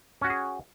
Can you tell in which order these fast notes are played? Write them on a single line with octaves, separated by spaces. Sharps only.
C#4 F#4 F#5 G#4